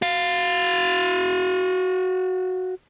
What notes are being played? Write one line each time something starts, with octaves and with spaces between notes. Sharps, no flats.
F#4 F5